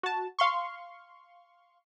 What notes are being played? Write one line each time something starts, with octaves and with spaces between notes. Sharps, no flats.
F#4 A5
F5 C6 C#6